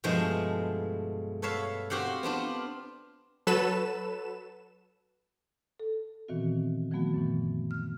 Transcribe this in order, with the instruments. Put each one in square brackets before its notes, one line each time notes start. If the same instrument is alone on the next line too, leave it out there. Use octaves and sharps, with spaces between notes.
[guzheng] G2 B2 F3 G#3 A3
A4 B4 C#5 E5 F5
C4 F#4 G4 F5 F#5
B3 C4 D4 F4
[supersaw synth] F#3 A4 B4 E7
[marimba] A4
A#2 D#3 E3 B3 C4 F#4
D#3 F3 F#3 A3 B3 F#4
F#2 A#2 E3
F6